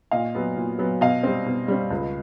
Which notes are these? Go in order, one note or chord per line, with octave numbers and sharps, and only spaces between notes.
A#2 D#5 F5
F#3 B3
A#2
F#3 B3
B2 D#5 F5
G3 C4
B2
G3 C4
C#2